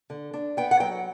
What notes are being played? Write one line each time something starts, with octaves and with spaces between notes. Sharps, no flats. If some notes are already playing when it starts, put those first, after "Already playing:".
D3
D4
B3 G5
F#5
F#3 G5